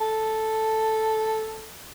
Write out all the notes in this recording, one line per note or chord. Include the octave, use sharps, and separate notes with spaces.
A4